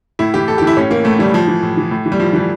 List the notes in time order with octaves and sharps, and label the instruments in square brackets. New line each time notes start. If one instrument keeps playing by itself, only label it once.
[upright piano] A2 E4
E3 G4
A2 A4
G4
E3
E4
A2 C#4
E3 A#3
A2 A3
E3 G3
A2 F3
E3
A2
E3
A2
E3
G3
A2 F3
E3 G3